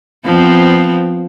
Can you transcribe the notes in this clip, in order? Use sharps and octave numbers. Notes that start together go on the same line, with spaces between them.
F3 B3 C4